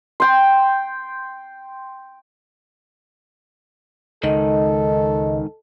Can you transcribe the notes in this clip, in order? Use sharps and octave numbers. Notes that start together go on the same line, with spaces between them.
G5 C6
C#2 G#2 D#3 A4 D#5